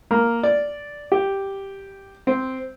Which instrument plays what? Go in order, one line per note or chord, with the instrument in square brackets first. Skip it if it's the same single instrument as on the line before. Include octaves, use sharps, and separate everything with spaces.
[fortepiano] A#3
D5
G4
C4